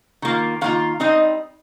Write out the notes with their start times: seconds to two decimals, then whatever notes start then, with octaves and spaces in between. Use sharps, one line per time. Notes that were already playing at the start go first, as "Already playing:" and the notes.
0.22 D#3 A#3 F4
0.61 D#3 A#3 F4 F5
1.00 G3 C4 D#4 D#5